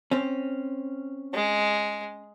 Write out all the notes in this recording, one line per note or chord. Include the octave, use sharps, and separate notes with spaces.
C4 C#4
G#3